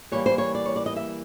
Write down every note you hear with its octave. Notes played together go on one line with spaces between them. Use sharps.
E3 G3 A#3 C#5
C5
C#5
D5
C#5
D5
D#5
E5